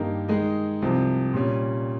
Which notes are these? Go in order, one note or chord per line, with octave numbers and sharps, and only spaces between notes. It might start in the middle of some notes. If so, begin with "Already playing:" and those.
Already playing: G2 D#3 A#3 D#4 G4
D#3 G#3 D#4 G#4
C2 C3 F3
A#2 G3 C#4